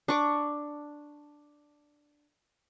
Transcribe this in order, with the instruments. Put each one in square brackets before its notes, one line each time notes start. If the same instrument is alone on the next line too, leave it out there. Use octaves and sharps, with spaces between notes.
[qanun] D4 C#6 D6